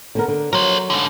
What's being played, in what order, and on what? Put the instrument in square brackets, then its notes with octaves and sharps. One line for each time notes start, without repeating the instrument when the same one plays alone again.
[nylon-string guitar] D3 B3 A#4
D3
[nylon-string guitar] F#3 [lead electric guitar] A#4 C5
[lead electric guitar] G#2 D3